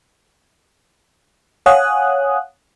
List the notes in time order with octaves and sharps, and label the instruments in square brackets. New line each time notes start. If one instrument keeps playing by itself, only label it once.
[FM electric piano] C#5 F5 F#5 G#5 D#6 F#6